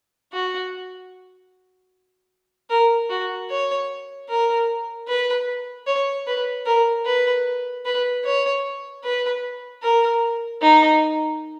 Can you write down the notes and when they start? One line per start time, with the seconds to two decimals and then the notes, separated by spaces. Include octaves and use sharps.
0.33 F#4
2.70 A#4
3.10 F#4
3.50 C#5
4.29 A#4
5.08 B4
5.87 C#5
6.27 B4
6.66 A#4
7.05 B4
7.85 B4
8.25 C#5
9.04 B4
9.83 A#4
10.62 D#4